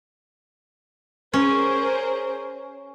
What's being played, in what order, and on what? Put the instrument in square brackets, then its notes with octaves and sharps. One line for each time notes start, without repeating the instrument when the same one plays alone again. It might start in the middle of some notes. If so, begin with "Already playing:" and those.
[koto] C#4 [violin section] G#4 A#4 C5